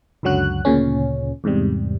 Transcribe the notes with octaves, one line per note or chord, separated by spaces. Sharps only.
C#2 F#2 D3 F#3 F#4 F#6
D2 A#2 C#3 C#4
E2 G#2 C3 G3